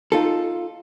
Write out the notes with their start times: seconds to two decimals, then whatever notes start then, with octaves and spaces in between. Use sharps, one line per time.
0.12 D#4 F4 A4